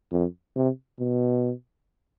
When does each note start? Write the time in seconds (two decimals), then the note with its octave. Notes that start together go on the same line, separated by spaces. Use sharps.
0.11 F2
0.55 C3
0.99 B2